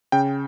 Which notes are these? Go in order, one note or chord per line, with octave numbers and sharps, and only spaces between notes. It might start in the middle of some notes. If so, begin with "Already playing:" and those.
C#3 G5